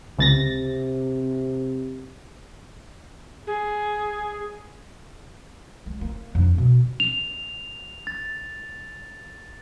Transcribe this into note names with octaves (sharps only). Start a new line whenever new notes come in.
C#2 C3 A6 A#6
G#4
G#3
A#3
F2 D4
B2
F7
A6